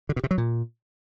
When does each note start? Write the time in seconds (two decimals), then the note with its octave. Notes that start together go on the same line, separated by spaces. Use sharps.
0.09 D3
0.16 B2
0.24 C3
0.31 F#3
0.38 A#2